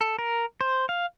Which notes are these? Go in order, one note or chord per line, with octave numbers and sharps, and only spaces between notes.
A4
A#4
C5
F5